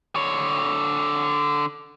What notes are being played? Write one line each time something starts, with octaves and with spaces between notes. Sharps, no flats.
D3 C#5